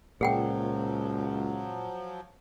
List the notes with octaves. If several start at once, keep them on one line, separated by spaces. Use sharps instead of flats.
C#2 A#2 F3 F#3 G#4 F#5 G5